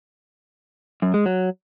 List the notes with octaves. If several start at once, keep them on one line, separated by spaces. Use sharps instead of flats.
F#2
G#3
F#3